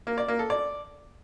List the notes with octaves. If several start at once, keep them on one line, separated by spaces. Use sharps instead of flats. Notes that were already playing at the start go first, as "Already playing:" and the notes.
A#3
D5
A#3
A4
D5